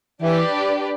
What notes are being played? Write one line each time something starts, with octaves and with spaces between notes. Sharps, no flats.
E3 D4 G4 B4 D5